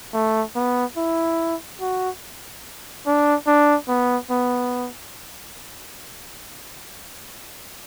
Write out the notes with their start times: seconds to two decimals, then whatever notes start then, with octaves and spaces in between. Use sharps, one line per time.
0.14 A3
0.56 B3
0.97 E4
1.81 F#4
3.06 D4
3.47 D4
3.89 B3
4.31 B3